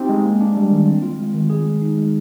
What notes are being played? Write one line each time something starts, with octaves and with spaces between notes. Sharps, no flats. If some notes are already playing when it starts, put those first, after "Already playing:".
Already playing: C4 D#4 G4
G#3
A#3
D4
G3
D#3
C4
F4
G#3
D#3
G#4
G#3
D#4
G#3